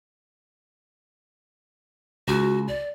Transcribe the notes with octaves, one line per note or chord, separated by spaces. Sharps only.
C#2 F#4
D5